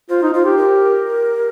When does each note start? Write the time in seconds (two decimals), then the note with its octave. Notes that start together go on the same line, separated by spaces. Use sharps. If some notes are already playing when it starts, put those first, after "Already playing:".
0.10 F4 C5
0.23 D#4
0.34 F4 C5
0.45 G4
0.57 A#4